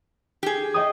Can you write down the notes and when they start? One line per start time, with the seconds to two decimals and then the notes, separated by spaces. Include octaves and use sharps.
0.43 G4 G#4
0.74 D#5 G5 D#6